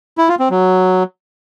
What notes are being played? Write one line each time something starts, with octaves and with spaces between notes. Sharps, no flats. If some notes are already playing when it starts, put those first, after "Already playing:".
E4
F4
C4
F#3